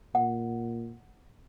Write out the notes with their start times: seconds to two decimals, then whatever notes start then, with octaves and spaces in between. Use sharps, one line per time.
0.15 A#2 F#5